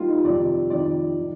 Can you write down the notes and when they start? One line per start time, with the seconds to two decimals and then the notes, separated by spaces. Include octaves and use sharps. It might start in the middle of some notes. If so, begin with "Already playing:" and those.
Already playing: D#2 D#3 G3 F4
0.09 D#4
0.24 F2 C3 D#3 G3 D5
0.70 F2 C3 D#3 D5
1.19 D#3